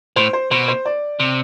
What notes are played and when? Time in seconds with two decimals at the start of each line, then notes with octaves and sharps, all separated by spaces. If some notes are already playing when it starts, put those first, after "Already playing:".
0.16 A2 C5
0.33 C5
0.51 B2 C5
0.68 C5
0.85 D5
1.20 C3